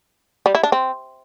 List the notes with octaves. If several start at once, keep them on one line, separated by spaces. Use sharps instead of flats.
G3
E4
D4
C4